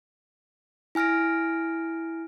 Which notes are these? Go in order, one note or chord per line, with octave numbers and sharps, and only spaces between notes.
E4 G#5 F6 A#6 D7